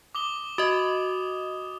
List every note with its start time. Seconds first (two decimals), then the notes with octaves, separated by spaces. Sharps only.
0.15 D6 D#6 G7
0.58 F#4 D#5 D#6